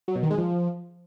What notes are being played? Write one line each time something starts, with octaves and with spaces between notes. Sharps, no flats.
F#3
B2
D#3
G#3
F3